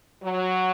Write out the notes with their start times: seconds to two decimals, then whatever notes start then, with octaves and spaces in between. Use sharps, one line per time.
0.23 F#3